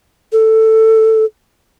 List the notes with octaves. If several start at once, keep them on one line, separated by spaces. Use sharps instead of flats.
A4